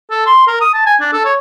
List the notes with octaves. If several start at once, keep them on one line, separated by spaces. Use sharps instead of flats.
A4
C6
A#4
D#6
A5
G#5
D4
A4
C#5